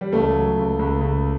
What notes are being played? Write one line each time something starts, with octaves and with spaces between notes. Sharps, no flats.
G3
C#2 A3
F#3
C#2
C#2
C#2